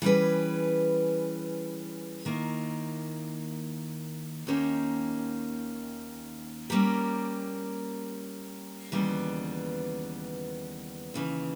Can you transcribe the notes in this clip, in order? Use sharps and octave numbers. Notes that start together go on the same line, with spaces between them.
E3 G3 C#4 G#4 B4
D#2 D#3 A#3 E4
D#2 D#3 A#3 C#4 G4
G3 A#3 C#4 G4 A#4
D#2 C#3 E3 G3 B3
D#2 C#3 E3